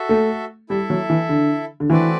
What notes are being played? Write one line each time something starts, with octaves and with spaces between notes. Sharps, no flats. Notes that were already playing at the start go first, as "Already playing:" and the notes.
Already playing: F#4 A4 E5
A3
G3 E4 A4 E5
F#3
E3
D3
D3
E3 A3 C4 F#4 B4 D5